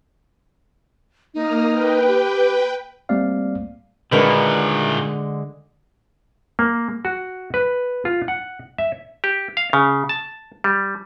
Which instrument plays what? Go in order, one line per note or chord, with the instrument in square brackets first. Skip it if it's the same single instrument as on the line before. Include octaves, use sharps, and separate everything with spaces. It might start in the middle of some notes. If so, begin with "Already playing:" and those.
[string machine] A#3 D#6 F6 [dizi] D#4
[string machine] B4 G5
[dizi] G4
[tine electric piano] G3 A3 A#3 C4 D5 F5
[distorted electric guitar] A#2 D#3 [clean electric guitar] D3 G#3 F#4 [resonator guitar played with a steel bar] D4 A#4 B4
[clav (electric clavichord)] A#3
F#4
B4
F4
F#5
E5
G4
F5
C#3
A5
G3